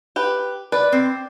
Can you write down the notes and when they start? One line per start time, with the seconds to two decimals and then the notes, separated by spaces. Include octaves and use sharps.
0.16 G4 B4
0.72 B4 D5
0.92 C4